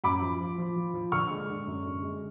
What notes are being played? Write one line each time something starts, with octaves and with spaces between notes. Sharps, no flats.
F#2 B5 D6
F3
F3
F3
F3
F3
D3 C#6 F6
G#3
D3
F#2
D3
G#3